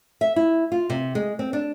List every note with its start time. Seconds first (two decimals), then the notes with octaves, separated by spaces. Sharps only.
0.21 E5
0.36 E4
0.72 F4
0.90 C3
1.15 G#3
1.39 C4
1.53 D4